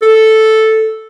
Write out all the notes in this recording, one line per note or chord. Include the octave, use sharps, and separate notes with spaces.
A4